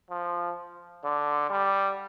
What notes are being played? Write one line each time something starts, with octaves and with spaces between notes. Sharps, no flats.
F3
D3
G3